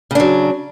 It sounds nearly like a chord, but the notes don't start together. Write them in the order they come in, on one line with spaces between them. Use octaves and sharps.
C#3 D4 F#3